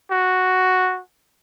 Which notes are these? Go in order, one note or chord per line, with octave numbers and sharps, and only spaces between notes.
F#4